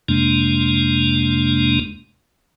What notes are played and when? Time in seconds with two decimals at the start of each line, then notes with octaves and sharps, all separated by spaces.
0.08 F2 C3 G#3 A#3 D4